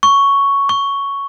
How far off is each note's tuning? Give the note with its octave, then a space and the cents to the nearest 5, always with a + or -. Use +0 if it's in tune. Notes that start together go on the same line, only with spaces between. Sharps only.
C#6 +5
C#6 +5